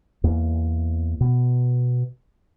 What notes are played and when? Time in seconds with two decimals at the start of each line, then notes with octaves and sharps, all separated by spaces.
0.24 E2 A#3
1.21 B2